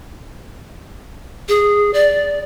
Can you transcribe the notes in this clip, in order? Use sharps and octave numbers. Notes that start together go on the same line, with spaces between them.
G#4
D5